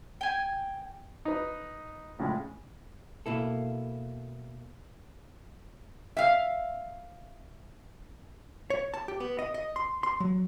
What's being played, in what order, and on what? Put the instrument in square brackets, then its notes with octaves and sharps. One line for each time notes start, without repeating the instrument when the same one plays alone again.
[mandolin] G5 G#5
[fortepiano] D#4 B4
F2 A2 C#3 G#3
[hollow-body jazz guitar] B2 A#3 E4 A4
[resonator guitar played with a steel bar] E5 F5
[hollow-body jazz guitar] C#5
A5
G4
B3
D#5
D#5
C6
C6
F#3